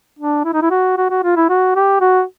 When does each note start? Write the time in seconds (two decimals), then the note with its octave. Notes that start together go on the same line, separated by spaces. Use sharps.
0.19 D4
0.44 E4
0.53 D#4
0.62 E4
0.70 F#4
0.97 F#4
1.10 F#4
1.23 F4
1.36 E4
1.49 F#4
1.76 G4
2.01 F#4